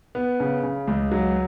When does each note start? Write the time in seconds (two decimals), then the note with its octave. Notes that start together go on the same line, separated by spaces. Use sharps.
0.15 B3
0.40 C#3
0.63 C#3
0.88 C#2
1.12 F#3